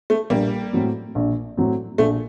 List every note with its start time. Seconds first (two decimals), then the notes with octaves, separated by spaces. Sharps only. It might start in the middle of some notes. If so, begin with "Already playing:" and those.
0.10 A3
0.30 A#1 G3 A#3
0.73 A2 F#3 C4
1.15 A#1
1.57 A2 F#3 C4
1.98 A#1 A3